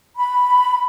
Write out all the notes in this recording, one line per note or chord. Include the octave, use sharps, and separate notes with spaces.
B5